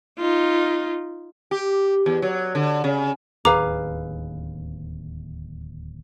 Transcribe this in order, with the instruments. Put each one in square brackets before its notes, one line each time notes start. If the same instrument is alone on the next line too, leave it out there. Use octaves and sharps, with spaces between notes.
[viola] D#4 F4
[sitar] G4
E2
F#3
D3
C#3
[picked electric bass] D1 D#2 [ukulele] G#4 B4 F5 [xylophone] A#5 D6